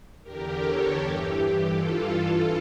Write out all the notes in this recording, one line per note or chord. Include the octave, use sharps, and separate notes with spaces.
E2 D3 G4 A#4
A4 C#5
G2 E3 G4
G2 E3 F4 A4